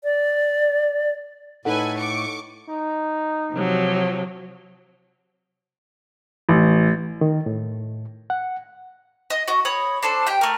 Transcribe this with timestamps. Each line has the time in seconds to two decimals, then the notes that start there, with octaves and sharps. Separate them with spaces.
0.04 D5
1.65 A2 D#4 A4 B4 F#5 G#5
1.97 C#6 D6
2.69 D#4
3.53 C3 F3 F#3
6.49 A1
7.21 D#3
7.46 A2
8.30 F#5
9.30 D#5
9.48 F#4 D#5
9.65 C#5 B5 D#6
10.03 D4 A4 C5
10.27 G4 G5
10.41 A3 A#4